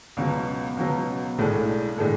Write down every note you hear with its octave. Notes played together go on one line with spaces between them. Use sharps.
C#2 B2 F#3
C#2 B2 F#3
B1 A2 G#3 D4 A4
A2 G#3 D4 A4